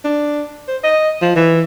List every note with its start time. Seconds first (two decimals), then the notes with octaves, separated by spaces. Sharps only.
0.04 D4
0.68 C5
0.83 D#5
1.22 F3
1.36 E3